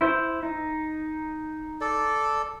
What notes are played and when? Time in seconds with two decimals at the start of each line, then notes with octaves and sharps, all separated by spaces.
0.01 E4 C5
0.43 D#4
1.81 A4 D5